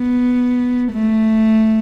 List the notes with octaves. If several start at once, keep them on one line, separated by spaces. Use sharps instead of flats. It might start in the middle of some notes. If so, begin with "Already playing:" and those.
Already playing: B3
A3